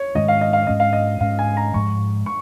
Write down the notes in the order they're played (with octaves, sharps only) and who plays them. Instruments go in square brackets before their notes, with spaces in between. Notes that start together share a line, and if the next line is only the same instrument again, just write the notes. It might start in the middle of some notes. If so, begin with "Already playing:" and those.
Already playing: [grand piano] C#5
[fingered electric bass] G#2 D#3 G#3 C#4 [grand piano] D#5
[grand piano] F5
D#5
F5
[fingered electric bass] G#2 G#3 C#4 [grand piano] D#5
[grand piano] F5
D#5
[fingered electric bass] G#2 G#3 C#4 [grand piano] F5
[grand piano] G#5
A#5
[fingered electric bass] G#2 F3 G#3 [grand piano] C#6
[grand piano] C#6